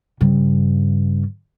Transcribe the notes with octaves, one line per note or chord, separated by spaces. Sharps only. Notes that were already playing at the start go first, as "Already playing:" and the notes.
G2 C#3